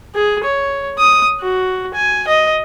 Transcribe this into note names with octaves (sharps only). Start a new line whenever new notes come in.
G#4
C#5
D#6
F#4
G#5
D#5